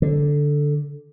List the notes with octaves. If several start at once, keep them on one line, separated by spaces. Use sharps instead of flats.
D3